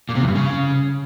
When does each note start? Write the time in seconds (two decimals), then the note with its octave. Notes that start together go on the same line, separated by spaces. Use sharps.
0.09 A#2
0.15 C3
0.22 E2
0.28 G2
0.34 C#3